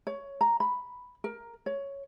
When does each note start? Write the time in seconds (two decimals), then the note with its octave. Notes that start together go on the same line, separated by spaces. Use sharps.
0.07 C#5
0.41 A#5
0.60 B5
1.24 A#4
1.66 C#5